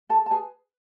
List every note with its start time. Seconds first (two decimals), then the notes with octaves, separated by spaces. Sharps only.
0.09 G#4 A4 A5
0.26 A5
0.31 G#4 B4 G#5